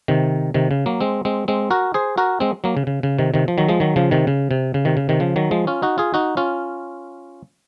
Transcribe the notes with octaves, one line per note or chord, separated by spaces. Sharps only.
C3 D#3
C3 D#3
C#3
F#3 A#3
G#3 C4
G#3 C4
G#3 C4
F#4 A#4
G#4 C5
F#4 A#4
G#3 C4
F#3 A#3
C#3
C#3
C#3
C3 D#3
C3 D#3
F3
D#3 F#3
F3 G#3
D#3 F#3
C#3 F3
C3 D#3
C#3
C3
C#3
C3 D#3
C#3
C3 D#3
C#3 F3
D#3 F#3
F3 G#3
C#4 F4
D#4 F#4
F4 G#4
D#4 F#4
C#4 F4